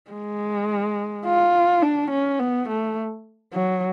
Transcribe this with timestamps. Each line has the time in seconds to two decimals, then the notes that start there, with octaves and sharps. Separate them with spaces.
0.11 G#3
1.25 F4
1.82 D4
2.10 C#4
2.39 B3
2.68 A3
3.54 F#3